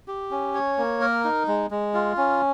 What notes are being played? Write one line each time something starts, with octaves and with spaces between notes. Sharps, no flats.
G4
C#4
C#5
A#3
A#4
D#4
G#3
G#3
F4
C#4